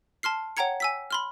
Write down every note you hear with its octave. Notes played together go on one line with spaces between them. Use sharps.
A5 C6 F6 C7
C#5 F#5 G5 A#5 G#6 C#7
G#5 E6 B6
B5 C6 F6